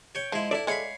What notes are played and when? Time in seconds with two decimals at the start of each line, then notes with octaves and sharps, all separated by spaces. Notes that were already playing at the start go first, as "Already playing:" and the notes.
0.15 C#5 G5
0.32 F3 G#3 E4
0.51 E4 A4 D5 E5
0.67 G#3 E4 C#5 F5 B5